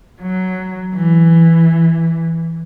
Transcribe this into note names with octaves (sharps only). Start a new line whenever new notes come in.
F#3
E3